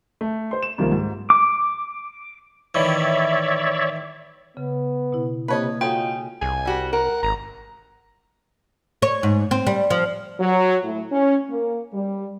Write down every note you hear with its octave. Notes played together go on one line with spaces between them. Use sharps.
A3
C5 C6
E7
C2 D#3 F3 A#3
G#2
D6
A2 D#3 E3 C#5 D5 E5
C#3 B3
B2 E4
C3 A#3 B4 C#5 D#5 A5
G#3 C#4 D#4 F4 F#4 A4 F#5 G5
C2 G#5
G3 F#4 G4
A#4 F#5
G#1 A#5
C#5
G#2
C4
G3
F3
F#3
A2
C#4
A#3
G3